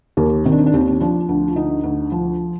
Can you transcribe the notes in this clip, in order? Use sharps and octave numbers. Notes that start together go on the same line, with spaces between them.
D#2 A#3
D#3 C4
D4
C4
D4
D#2 C4
D4
C4
F3 D4
D2
F4
D3 D#4
D2
F3